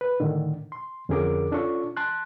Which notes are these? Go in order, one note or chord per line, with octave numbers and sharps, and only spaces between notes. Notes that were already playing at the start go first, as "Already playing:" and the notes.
B4
A2 D3 D#3
C6
F2 D3 C#4 G#4 A#4 D6
C#4 D4 F4 A4 C#6
A5 C6 F#6